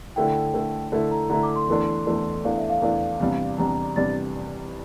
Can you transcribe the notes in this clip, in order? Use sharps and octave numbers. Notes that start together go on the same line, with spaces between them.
D3 A3 E4 G5
D3 A3 E4
D3 A3 E4
A#5
D3 A3 E4 A#5
D6
C6
E2 E3 A3 D4
E2 E3 A3 D4
E2 E3 A3 D4 F5
E5
F5
E2 E3 A3 D4
E2 C3 G3 D4
E2 C3 G3 D4 A#5
E2 C3 G3 D4 A6